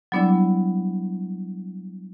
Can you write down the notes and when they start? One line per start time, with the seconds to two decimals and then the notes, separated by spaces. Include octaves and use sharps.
0.12 F#3 G3 B3 D4 E4 D5